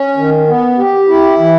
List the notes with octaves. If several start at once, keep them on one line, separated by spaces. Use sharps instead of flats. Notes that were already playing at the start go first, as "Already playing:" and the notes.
Already playing: C#4
D#3
B3
G4
E4
E3